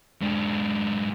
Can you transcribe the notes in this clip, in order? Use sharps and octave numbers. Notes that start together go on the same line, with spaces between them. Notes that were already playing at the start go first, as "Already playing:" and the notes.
G#2 D4